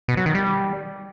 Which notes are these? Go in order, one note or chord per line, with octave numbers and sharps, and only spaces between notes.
B2
F#3
D#3
G3